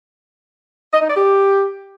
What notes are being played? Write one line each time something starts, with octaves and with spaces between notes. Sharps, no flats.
D#5
D#4
D5
G4